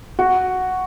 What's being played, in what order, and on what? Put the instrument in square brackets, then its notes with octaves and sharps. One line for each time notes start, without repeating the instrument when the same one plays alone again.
[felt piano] F#4